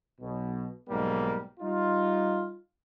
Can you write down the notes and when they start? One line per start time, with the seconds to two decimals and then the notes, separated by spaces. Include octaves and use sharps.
0.21 B1 B2
0.89 B1 G#2 G3 A#3
1.60 G3 D#4 F4